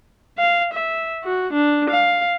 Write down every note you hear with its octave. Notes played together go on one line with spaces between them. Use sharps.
F5
E5
F#4
D4
F5